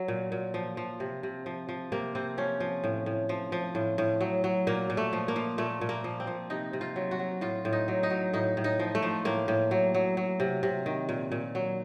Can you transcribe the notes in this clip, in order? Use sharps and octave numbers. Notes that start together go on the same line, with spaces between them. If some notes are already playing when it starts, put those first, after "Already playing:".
Already playing: F#3
A#2
A#2
F3
F3
C3
C3
F3
F3
C3 A#3
C3 C4
F3 C#4
F3
A2
A2
F3
F3
A2
A2
F#3
F#3
A#2 A#3
A#2
A3
F3
A#3
F3
A#2 A3
A#2
A#3
F3
C4
F3
C3 D#4
C3
F4
F#3
F#4
F#3
A2 F4
A2
D#4
F#3
D#4
F#3
A2 D#4
A2
D#4
F3
A3
F3
A2 A#3
A2
F#3
F#3
F#3
C3
C3
D#3
A#2
A#2
F#3